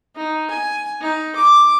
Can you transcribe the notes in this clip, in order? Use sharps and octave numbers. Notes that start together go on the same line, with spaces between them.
D#4
G#5
D#4
D6